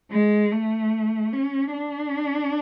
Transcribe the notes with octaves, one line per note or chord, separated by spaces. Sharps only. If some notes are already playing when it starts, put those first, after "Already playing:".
G#3
A3
C#4
D4